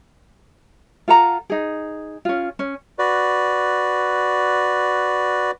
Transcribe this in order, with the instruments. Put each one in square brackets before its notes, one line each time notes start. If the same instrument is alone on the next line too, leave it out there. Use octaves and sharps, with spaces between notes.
[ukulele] F4 A4 F#5 A#5
D#4 G#4
C#4 F4
C#4
[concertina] F#4 B4 D5